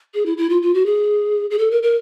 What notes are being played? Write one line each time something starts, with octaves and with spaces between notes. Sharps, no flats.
G#4
E4
E4
F4
F4
F#4
G#4
G#4
A4
A#4
A#4